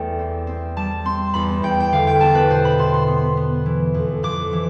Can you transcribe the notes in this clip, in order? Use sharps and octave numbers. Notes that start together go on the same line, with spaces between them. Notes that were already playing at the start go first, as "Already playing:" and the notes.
Already playing: E2 A3 D5 G5
C4
C4
G3 A5
C4 C6
E2 B5
E2 G5
G5
D3 F5
G5
E2 A5
B4
B2 C5
B5
B2 C6
C6
B3
B3
E3
F2
F2 D6
E3